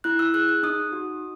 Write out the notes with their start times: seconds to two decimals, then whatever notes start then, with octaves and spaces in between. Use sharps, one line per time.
0.04 E4 F#6
0.19 E6
0.34 G#4 F#6
0.49 F#6
0.63 D#4 D#6
0.92 F#4